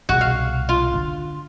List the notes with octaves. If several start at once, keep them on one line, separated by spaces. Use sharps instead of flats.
C2 B2 F#4
F5
F4
D3